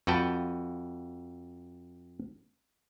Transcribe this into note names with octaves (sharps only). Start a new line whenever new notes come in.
F2 F#4 B4 G5 A5